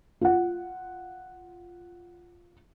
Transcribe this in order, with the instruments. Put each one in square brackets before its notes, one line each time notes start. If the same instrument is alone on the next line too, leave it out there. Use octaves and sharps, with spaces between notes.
[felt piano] F4 F#5